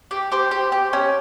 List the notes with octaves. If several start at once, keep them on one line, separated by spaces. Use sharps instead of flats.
G4
G4 C5
G4
G4
C#4